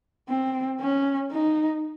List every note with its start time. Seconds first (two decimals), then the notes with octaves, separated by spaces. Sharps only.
0.29 C4
0.81 C#4
1.31 D#4